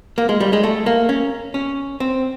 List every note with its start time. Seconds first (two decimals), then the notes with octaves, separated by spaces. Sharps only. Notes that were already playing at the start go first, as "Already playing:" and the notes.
0.18 A#3
0.29 G#3
0.41 G3
0.53 G#3
0.63 A3
0.86 A#3
1.09 C#4
1.54 C#4
2.00 C4